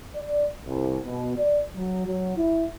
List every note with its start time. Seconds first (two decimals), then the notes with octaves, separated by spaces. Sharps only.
0.16 D5
0.66 C2
1.05 B2
1.37 D5
1.76 F#3
2.06 F#3
2.37 E4